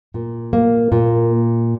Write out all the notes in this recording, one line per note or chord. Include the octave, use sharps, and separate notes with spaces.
A#2
A#3
A#2